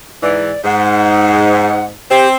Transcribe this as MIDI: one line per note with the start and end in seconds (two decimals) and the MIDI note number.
0.23 0.52 44
0.23 0.52 52
0.23 0.64 74
0.64 1.94 44
0.64 1.85 78
2.10 2.36 60
2.10 2.27 67